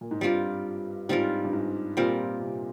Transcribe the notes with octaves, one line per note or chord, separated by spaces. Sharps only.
A#2
G#2
G2 G3 C4 F4 A#4
G#2 G3 C4 F4 A#4
G2
G#2
A#2 G3 C4 F4 A#4
C3